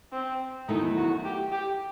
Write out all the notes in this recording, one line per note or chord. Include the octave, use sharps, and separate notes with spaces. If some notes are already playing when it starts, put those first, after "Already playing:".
C4
E2 D#3 F#3 A3 D#4 E4
F#4
G4
G4